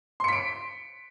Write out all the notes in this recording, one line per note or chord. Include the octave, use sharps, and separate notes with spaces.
C6 B6 C#7 D7